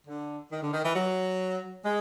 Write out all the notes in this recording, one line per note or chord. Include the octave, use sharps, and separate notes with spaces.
D3
D#3
D3
D#3
E3
F#3
G#3